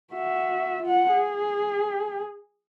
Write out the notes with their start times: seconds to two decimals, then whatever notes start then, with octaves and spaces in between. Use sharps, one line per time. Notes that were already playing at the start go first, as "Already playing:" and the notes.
0.14 F#4 E5
0.83 F4 F#5
1.13 G#4